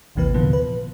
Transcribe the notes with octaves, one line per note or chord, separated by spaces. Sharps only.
A1 D#2 C3 E3 A#3 B4
A#2 D3 E3 F3 B3
B4